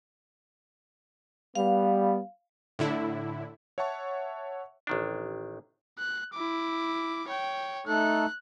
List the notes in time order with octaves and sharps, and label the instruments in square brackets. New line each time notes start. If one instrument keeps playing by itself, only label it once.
[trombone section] G3 B3 [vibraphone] F5
[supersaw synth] A2 D3 E4
[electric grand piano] C#5 E5 F#5 A5 C#6
[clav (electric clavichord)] A1 D#3 D4
[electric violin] F#6
E4 D6
C#5 G5
[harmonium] A3 D#4 A4 [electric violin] F#6